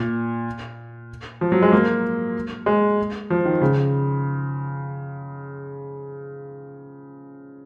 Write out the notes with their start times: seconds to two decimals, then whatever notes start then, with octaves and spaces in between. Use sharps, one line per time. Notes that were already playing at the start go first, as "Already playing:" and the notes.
Already playing: A#2
1.41 F3
1.52 F#3
1.62 G#3
1.72 A#3
2.66 G#3
3.30 F3
3.45 D#3
3.62 C#3